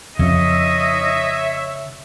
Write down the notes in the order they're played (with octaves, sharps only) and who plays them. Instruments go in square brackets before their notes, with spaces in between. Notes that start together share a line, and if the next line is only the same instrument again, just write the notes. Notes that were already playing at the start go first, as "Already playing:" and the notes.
[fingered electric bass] F2 [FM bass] C#3 [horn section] C#5 E5 [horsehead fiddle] D#5